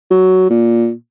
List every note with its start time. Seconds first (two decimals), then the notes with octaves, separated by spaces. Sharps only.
0.10 F#3
0.50 A#2